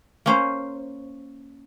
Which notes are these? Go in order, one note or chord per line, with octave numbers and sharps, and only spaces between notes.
A#3 C#4 C5